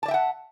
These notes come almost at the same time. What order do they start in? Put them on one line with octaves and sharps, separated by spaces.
A5 D5 E5 G5 F#5